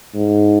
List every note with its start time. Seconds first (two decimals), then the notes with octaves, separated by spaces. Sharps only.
0.15 G#2